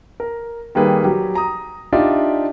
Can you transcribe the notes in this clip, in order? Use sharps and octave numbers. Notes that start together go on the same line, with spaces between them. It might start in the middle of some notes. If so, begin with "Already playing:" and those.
A#4
D#3 G3 A#3 G#4 B4
F#3 G4
A#5 D#6
D4 D#4 F4 G4 D5 E5